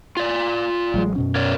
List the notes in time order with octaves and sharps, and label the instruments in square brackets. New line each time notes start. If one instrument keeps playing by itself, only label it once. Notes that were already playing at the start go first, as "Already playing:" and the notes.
[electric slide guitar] F4 D5
[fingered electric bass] A1 F#3 G#3
F#2 B2 C#4
[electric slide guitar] A#4 C#5 D5